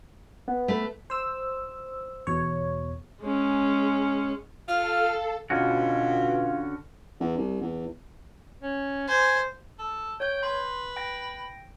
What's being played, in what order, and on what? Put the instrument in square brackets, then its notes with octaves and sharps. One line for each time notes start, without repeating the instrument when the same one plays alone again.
[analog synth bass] B3
[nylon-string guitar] A3 B4
[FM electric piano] C5 E6
E2 B2 C#5
[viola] G#3 C#4
[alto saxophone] F4 [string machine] A4 [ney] F5 [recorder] F6
[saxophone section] B2 [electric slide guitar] D3 C#4 F#4 [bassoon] F4
[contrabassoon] E2
C2
E2
[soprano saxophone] C#4
[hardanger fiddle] C5 [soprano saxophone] G#5
[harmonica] A4
[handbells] C#5 G6 [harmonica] G5
[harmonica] B4 [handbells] C6
[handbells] G5 A#6